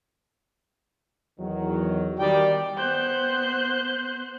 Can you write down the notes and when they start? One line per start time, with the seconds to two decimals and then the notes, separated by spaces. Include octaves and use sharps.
1.39 E2 D#3 F#3
2.19 D#3 G3 D5 G5
2.77 B3 C5 F#6 G6